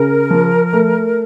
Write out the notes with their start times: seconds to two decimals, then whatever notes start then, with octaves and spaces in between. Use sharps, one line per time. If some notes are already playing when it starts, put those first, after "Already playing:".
Already playing: C#3 A#4
0.30 F3
0.73 A3